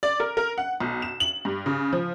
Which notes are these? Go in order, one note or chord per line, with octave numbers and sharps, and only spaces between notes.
D5
A#4
A#4
F#5
B1
E7
F#7
G2
C#3
F3